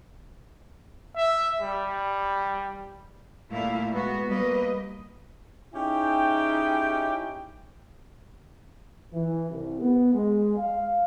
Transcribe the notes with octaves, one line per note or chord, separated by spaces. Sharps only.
E5
G3
A#2 G3 A3 E4 F5
G#3 B3 F#4
G3 A#3 B4 D#5
C#4 D#4 E4 G4 G#4 G5
E3
C2
B3
G#3
F5